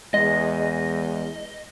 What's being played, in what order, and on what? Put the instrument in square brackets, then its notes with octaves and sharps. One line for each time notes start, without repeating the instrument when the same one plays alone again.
[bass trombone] E2 [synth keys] G#3 [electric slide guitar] D#5